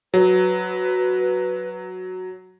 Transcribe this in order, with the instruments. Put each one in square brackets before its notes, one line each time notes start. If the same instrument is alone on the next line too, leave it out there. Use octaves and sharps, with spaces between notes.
[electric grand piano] F#3 [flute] B4